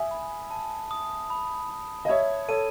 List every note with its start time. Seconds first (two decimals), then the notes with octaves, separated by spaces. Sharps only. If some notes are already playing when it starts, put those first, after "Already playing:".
Already playing: E5 G#5 D#6
0.11 B5
0.51 A5
0.91 D#6
1.30 B5
1.70 B5
2.05 D#5
2.08 C#5 E5 G#6
2.48 A4 C#5 D#7